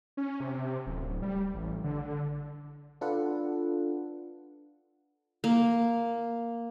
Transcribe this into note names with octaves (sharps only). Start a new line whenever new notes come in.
C#4
C3
D1
G3
A1
D3
D4 F4 A4 B4 F#5
A#3